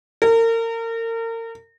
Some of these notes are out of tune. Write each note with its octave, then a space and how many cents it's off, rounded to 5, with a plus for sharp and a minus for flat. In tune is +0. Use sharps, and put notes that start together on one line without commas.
A#4 -35